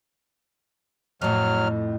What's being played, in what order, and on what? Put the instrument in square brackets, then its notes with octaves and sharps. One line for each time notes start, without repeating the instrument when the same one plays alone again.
[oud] F2 A2 [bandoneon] F#3 F6